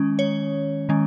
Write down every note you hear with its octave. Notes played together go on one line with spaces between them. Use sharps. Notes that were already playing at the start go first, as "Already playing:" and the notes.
Already playing: D#3 G#3 C#4
C#5
D#3 G#3 C#4